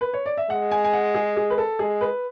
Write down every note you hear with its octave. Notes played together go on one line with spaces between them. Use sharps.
B4
C#5
D5
E5
G#3 F#5
G#5
G#5
F#5
G#4
G#4
B4
A4
G#3 G#4
B4